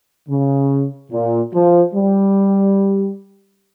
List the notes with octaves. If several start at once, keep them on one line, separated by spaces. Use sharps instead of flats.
C#3
A#2
F3
G3